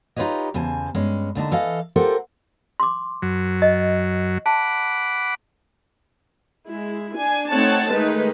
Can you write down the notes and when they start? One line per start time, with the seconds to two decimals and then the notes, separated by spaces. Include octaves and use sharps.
0.16 D#4 F4 G4 B4 C#5 D#5
0.54 E2 C#3 C5 G#5 A5
0.95 G2 G#3 C#4
1.35 D#2 D3 D#4 A5
1.51 E3 A4 D#5 F5
1.96 F4 G4 A4 A#4 C5 F#5
2.80 C6 D6
3.22 F#2 F#3
3.62 D#5
4.46 F#5 A5 B5 D6
6.67 G#3 E4
7.17 D4 G#5
7.51 A3 C4 D#4 C#5 F#5 A5
7.92 D#3 G#3 A3 D#4 B4